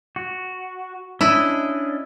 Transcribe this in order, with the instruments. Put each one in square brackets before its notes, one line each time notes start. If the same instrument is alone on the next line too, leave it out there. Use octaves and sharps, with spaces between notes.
[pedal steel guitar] F#4
[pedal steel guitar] C#4 D4 D#5 [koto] E4